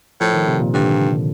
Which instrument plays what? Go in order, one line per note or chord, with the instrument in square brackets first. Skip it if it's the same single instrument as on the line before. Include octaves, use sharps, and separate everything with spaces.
[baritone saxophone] A2 [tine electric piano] F3
[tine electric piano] D#3
C3
A#2
[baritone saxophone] G2 [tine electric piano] D3